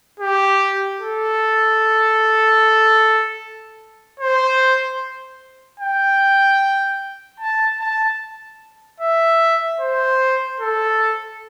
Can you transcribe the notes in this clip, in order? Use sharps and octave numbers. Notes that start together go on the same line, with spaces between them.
G4
A4
C5
G5
A5
A5
E5
C5
A4